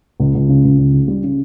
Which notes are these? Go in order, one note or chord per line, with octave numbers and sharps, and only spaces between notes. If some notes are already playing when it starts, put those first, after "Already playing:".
C#2
C#2
C#3
C#2
C#3
C#3
G3
C#3